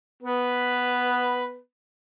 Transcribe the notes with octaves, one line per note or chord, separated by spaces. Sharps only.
B3 B4